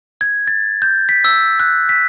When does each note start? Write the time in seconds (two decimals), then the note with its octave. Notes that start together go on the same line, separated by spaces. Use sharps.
0.21 G#6
0.47 A6
0.82 G6
1.09 B6
1.24 E6
1.60 F#6
1.89 B6